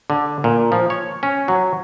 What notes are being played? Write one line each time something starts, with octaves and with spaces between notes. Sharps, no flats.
D3
A#2
F3
C#5
C#4
F#3